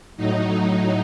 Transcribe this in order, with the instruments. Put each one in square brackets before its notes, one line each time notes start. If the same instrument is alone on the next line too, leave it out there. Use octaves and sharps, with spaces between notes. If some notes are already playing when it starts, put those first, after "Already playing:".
[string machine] A2 F#3 D#4